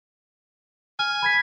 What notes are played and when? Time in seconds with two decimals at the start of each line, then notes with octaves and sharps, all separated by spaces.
0.99 G#5 F6
1.22 B5 G#6 B6